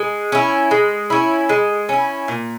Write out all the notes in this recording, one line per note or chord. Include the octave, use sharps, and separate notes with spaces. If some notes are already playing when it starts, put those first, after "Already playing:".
Already playing: G#3
C#4 E4
G#3
C#4 E4
G#3
C#4 E4
A#2